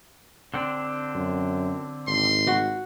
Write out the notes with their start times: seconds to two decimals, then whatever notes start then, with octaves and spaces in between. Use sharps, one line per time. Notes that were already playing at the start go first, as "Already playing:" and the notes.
0.54 D3 C4 D4
1.15 F#2
2.07 G#1 C6
2.47 F#4